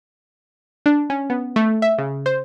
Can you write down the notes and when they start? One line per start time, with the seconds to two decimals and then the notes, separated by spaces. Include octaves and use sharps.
0.86 D4
1.10 C#4
1.30 B3
1.56 A3
1.82 E5
1.98 C#3
2.26 C5